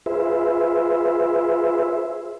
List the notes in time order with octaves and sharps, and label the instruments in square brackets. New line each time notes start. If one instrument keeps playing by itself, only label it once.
[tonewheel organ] F4 G#4 B4 C5 E5